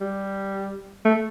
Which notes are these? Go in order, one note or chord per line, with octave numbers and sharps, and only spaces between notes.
G3
A3